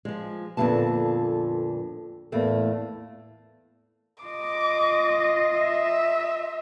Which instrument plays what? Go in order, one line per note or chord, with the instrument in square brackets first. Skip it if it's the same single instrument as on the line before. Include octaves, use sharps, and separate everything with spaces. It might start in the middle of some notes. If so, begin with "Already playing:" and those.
[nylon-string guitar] F3 G#3
F2 A#2 D3 F3 B3 A5
E2 A2 A3 A#3
[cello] F4 D#5 [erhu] D6
[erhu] E5